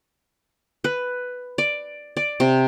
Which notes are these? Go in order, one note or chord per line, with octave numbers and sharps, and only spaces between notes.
B4
D5
D5
C3